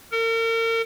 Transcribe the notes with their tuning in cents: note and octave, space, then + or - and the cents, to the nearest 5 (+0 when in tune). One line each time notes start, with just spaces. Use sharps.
A#4 -40